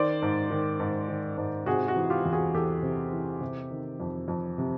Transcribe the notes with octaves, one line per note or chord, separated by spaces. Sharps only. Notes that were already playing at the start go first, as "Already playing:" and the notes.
Already playing: D#3 C5 D5
G#2
D#3
G#2
D#3
G#2
C3 F#4 G#4
F#4
E3
F4 G4
E2
F#4 G#4
E2 G4 A4
C3
E3
C3
D#3
F2
F2
C3